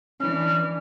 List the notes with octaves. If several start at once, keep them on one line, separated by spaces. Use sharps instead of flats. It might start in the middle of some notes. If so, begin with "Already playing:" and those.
E3 C#4 D4 F6